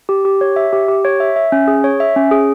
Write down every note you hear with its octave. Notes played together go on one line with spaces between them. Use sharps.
G4
G4
C#5
E5
G4
G4
C#5
E5
E5
C#4
G#4
C#5
E5
C#4
G#4